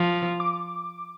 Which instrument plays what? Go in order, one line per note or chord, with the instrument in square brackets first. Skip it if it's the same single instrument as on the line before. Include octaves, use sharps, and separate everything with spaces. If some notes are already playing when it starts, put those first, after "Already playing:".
Already playing: [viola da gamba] F3
[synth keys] D6